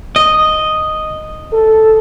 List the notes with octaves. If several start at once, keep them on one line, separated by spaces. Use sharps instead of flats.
D#5
A4